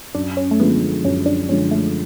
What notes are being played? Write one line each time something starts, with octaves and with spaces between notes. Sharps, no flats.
F#2 D4
C#4
A3
D3 F3 G#3 B3
F#2 C#4
D4
D3 F3 G#3 C#4
A3